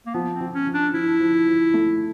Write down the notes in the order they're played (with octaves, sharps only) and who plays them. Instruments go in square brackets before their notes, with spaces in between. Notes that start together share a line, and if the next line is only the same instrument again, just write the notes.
[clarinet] A#3
[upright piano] F3 [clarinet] B3
[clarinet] C4
[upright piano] F3
[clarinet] C#4
[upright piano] F3
[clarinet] D4
[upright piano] F3 [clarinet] E4
[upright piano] F3
F3
A3